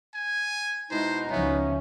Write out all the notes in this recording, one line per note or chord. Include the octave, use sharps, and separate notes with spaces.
G#5
B2 G#3 D#4 E4 C5
C#2 F3 B3 C#4 E5